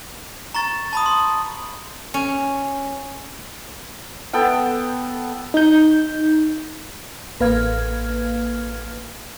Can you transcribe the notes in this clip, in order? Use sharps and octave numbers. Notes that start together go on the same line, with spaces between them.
A#5 C#6 A6
A5 B5 D#6
C6
C#4
B3 A4 G5
D#4 G6
A1 A#3 B4 F5 F6 G#6